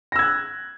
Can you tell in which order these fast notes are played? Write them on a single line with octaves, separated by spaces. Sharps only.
A#6 E6 G#6 F#6